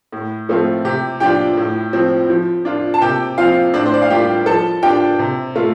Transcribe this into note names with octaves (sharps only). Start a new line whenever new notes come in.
A2
F3 A3 C4 F4
C3 G4
F3 D4 F4 G4 G5
A2
F3 C4
F3
D4 F4
A5
C3 G4 G5
F3 C4 F4 F5
A2 D4 D5
C5
D5
F5
G3 D4 F4 G4 G5
F3 A4 A5
D4 F4 G4 G5
C3
A3 F4